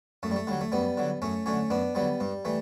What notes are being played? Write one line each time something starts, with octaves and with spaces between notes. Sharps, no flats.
F#2 A3
G3
A3
D3 F#3 G3
A3
F#2 G3 B3
D3 F#3
F#2 A3 C#4
D3 F#3 A3 C#4
F#2 B3 D4
D3 F#3 G3 B3
G2 G3
E3 G3 A3